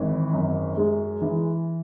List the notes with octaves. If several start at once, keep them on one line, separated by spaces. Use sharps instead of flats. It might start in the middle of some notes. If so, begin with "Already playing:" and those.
Already playing: G#1 E3
F#2
G#3
E3